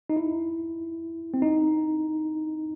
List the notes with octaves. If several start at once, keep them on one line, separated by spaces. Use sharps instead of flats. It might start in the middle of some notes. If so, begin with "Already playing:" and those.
D#4
E4
C4
D#4